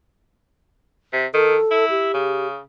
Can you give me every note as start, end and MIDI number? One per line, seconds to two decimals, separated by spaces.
1.13 1.26 48
1.34 1.56 51
1.34 1.85 69
1.71 2.11 64
1.90 2.47 67
2.14 2.60 49